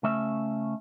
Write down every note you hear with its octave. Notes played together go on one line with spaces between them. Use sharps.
C#3 A3 C#4 E5